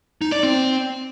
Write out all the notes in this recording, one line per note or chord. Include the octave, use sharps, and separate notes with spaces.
D#4
D5
C4